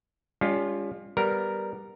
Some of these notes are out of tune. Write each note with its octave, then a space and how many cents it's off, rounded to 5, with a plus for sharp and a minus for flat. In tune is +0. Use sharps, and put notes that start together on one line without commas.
G3 +45 C#4 +35 F4 +0
G3 +0 B3 +0 A#4 +0